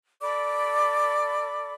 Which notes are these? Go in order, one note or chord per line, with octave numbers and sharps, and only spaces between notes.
A4 D5 B5 D6